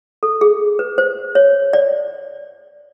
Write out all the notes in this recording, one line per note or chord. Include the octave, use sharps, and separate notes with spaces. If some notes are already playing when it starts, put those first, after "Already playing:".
A4
G#4
B4
C5
C#5
D5